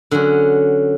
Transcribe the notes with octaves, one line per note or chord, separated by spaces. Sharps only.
D3 F#3 C#4